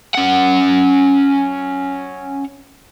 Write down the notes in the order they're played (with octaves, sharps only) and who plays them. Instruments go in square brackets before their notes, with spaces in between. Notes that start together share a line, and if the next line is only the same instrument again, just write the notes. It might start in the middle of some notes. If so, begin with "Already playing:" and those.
[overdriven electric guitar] C#4 F#5